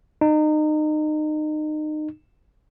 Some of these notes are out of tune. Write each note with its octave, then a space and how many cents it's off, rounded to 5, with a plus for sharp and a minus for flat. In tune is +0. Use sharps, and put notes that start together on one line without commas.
D#4 -30